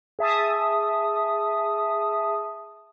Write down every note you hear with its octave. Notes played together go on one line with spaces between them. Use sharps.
G#4 E5 A5 D#6